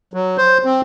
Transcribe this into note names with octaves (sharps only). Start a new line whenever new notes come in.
F#3
C5
C4